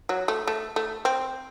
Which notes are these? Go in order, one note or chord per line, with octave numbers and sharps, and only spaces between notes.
F#3
A3
A3
A3
C4